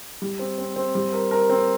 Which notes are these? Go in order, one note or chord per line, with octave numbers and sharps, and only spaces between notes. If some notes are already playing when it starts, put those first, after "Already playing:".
G3
C4
C4
C4
G3
A#4
A#4
C4